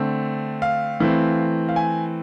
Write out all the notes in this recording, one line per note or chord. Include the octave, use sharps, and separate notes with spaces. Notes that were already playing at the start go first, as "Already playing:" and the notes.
Already playing: D3 A3 C4
F5
E3 A3 C4
F5
G#5